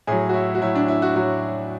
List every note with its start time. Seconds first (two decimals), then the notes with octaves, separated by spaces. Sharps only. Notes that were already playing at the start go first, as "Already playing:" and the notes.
0.07 A2 F#3 G#4
0.29 F#4
0.34 E4
0.55 F#4
0.61 A2 F#3 E4
0.75 D4
0.88 E4
1.02 F#4
1.15 A2 F#3 F#4